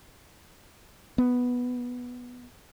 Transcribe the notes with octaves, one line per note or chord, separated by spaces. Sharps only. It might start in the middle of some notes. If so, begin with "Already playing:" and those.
B3